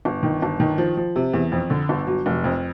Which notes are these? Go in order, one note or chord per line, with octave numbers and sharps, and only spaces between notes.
G1
D#3
G1
D#3
F3
F3
C3
E2
F2
D3
G1
F#3
F1
F2